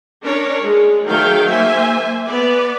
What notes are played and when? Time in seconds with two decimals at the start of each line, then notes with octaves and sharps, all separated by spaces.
0.24 C#4 D4 A#4 C#5
0.64 G#3
1.05 D#3 F#3 A3 G#4 F5 G5
1.49 A#3 C5 E5 G#5
2.27 B3 B4 D5